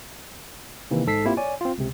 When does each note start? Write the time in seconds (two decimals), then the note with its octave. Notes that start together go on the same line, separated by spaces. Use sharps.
0.91 C3 D#3 E3 A#3
1.06 A1 G#2 A4 B6 C7
1.25 A#3 C4 E4 F4 G4
1.37 C#5 D5 G#5
1.61 C4 F4
1.78 C#2 C3